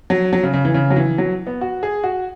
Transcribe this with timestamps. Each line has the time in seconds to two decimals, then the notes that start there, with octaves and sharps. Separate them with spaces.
0.10 F#3
0.33 F#3
0.43 C#3
0.53 C#3
0.65 E3
0.74 C#3
0.90 F#3
0.96 E3
1.18 F#3
1.47 B3
1.61 F#4
1.83 G#4
2.04 F#4